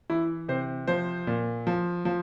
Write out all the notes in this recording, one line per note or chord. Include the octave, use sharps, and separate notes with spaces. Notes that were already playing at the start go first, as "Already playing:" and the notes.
E3 E4
C3 C5
F3 C5
A#2
F3
F3